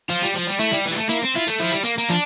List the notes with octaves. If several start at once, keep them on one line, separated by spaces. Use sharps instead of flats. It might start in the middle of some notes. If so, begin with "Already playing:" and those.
F3 F4
G3
F3
G3
A3 E4
G3
E3
G3
A3
A#3 E4
C4
E4 F4
A3
F3 E4
G3
A#3
A#3
F3 D4